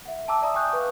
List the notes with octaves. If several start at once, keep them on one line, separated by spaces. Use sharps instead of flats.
E5 F#5
G5 A5 A#5 D6 E6
D5 E5 A#5 D#6
G5 G#5 C#6 D#6 F#6 G6
B4 F5